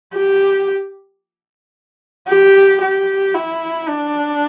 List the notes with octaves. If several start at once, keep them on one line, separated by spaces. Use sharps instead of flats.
G4
G4
G4
E4
D4